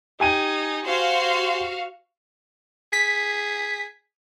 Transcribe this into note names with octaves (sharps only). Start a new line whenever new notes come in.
D#4 G4 G#5 D#7
F#4 C5 F5 C6
G#4 B6